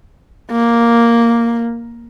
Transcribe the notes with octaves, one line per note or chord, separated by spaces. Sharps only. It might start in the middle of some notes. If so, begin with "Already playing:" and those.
A#3